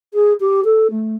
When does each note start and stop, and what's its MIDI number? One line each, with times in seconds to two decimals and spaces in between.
0.14 0.33 68
0.40 0.61 67
0.64 0.87 69
0.90 1.15 57